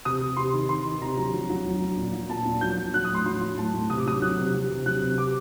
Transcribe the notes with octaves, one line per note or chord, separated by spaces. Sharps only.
C3 D#6
C3
C3 C6
D#3
D#3 C6
D#3
C3 A#5
F#3
F#3
F#3
F#3
F#3
A#2
F#3
A#2 A5
A#2
F#3 G6
F#3
F#3 F#6
D#6
A2 C6
F#3 C6
F#3
A2 A5
A2
C3 D#6
D6
F#3 D#6
F#3 F#6
C3
F#3
C3
F#3 F#6
C3
C3 D6